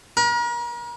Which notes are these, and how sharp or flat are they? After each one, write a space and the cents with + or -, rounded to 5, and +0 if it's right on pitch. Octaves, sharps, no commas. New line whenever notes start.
A#4 +40